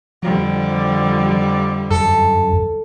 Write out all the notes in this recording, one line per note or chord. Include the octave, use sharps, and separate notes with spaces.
F2 D3 F3 G3
F#2 A4